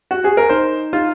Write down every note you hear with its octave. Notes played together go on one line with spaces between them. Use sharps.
F#4
G#4
A#4
D#4 C5
D#4 F4